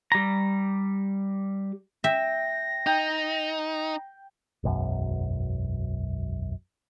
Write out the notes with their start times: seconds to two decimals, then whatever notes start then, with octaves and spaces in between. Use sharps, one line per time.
0.12 G3 A#5
2.04 E5 G5 A#6
2.87 D#4 G5
4.63 E1 B1 F#2